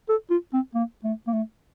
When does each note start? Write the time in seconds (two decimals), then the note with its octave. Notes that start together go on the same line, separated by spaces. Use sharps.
0.09 A4
0.30 F4
0.53 C4
0.74 A#3
1.04 A3
1.27 A#3
1.33 A3